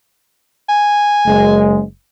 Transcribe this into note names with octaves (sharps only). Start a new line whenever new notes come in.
G#5
F#1 G#3